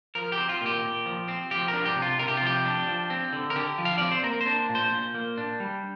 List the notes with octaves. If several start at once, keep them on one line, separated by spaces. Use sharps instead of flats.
F3 A#4
G4
C4
F4
A#2 G4
A#2
F3
C4
F3 G4
A#4
D4
G4
C3
F4
C3 A#4
G4
F4
F3 G4
D4
F3
C4
D3
A#4
D3 G4
F3
F5
C4 D5
C5
A#3 A#4
C5
D4
A#2
C5
A#2
A#3
D4
G3